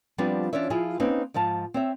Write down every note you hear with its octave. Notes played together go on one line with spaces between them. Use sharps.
F3 G3 B3 C4 D4 F4
E3 C#4 D4 F4 C#5 E5
F3 E4 F4 G#4
A#3 C4 C#4 D#4 B4
G#2 F3 F5 A5
C4 C#5 E5